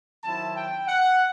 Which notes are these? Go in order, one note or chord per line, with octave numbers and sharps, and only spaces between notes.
D#3 F#3 C4 E4 A5
G5
F#5